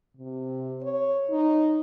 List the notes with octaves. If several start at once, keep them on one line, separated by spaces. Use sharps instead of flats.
C3
C#5
D#4